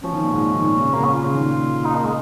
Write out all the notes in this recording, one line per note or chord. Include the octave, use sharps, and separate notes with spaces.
F3 C#4
D#3
A#2
G#2
A#2
D#3
A#2
C#3
C#3 A#3
C#4
F4
C#3
D#3
A#2
D#4
A#3
G#3